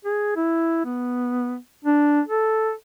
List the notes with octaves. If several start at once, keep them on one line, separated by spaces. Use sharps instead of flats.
G#4
E4
B3
D4
A4